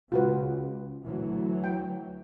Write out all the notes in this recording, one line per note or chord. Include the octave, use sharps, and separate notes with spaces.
C#2 F4 F#4 B4
D2 E3 F#3
G5